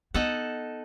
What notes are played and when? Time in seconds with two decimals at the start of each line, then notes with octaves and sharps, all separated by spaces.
0.14 B3 D#4 A4 F#5